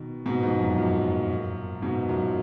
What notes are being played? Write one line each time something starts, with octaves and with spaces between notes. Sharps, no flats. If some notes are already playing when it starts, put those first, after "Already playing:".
Already playing: B2 D#3
G#2 B2
F2 G#2
F#2
F#2 A#2
G#2 B2
F#2 A#2